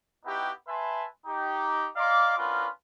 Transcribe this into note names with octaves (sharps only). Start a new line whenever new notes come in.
B3 D#4 E4 F#4 G4
B4 E5 G#5 A5 B5 C6
D#4 G4
D5 D#5 F5 A#5 C6 D6
C#4 D4 F4 F#4 A#4 B4